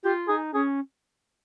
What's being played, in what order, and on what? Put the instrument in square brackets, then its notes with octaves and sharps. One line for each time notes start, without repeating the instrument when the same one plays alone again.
[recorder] F4 [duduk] G4
[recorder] D#4 [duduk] G#4
[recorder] C#4 [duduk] G#4